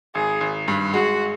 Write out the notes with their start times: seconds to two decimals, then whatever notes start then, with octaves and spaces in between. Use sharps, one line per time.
0.15 G#1 G#4
0.41 G#1
0.68 G2
0.94 G#3 F#4